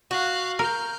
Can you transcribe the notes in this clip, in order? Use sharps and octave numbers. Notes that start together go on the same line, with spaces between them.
F#4 F5 F#6
A#4 F6 G6